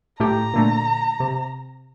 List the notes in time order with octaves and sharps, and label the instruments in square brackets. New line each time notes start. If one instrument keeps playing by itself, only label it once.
[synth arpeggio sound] A2 A3 G4 [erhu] A#5
[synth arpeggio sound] A#2 D3 A3
C3